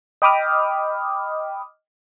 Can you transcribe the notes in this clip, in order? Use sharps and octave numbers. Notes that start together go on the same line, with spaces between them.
D#5 G5 B5 D6 D#6 F6